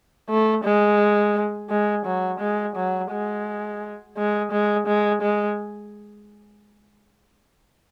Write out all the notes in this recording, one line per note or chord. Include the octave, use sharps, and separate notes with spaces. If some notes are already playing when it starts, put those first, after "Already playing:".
A3
G#3
G#3
F#3
G#3
F#3
G#3
G#3
G#3
G#3
G#3